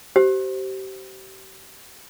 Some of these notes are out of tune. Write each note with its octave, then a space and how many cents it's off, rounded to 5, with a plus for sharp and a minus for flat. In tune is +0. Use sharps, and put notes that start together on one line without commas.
G4 -35 C5 +0